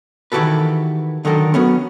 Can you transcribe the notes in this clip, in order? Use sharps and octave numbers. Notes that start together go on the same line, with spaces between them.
D#3 E3 F#4 G4 A4 B4
D3 D#3 F#3 A4 A#4
F#3 B3 C#4